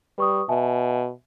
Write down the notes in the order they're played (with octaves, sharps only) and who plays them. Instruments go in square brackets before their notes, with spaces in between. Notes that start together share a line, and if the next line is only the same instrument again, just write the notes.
[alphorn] G3 [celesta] B4 C#6 D#6
[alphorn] B2 [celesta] E5 G#5 A5